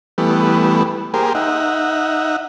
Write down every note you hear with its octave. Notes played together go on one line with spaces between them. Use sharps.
E3 G3 A3 B3
A#3 G4 G#4 A#4 C5
D#4 E5 F#5